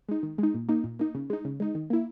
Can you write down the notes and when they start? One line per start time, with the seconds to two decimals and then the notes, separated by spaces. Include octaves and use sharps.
0.09 G#3 D#4
0.23 D#3
0.38 G#3 D#4
0.54 A#2
0.68 A#3 D#4
0.84 A#2
0.99 A#3 D#4
1.15 C#3
1.30 G#3 D#4
1.45 C#3
1.60 G#3 D#4
1.75 D#3
1.90 A#3 E4